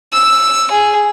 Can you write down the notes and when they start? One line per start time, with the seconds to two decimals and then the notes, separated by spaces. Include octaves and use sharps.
0.13 E6
0.71 G#4